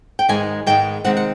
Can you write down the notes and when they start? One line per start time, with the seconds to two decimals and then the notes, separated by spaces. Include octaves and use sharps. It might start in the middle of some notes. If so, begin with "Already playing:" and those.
0.19 G5
0.29 G#2 D#3 G#3 B3 G#5
0.66 G#2 D#3 G#3 B3 G5
1.04 C3 D#3 G#3 C4 F#5
1.17 F#5